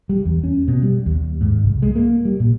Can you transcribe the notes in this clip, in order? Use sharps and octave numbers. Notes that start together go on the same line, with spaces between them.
G3
E2
C#4
B2
G3
D#2
G#2
C2
G#3
A#3
G3
A#2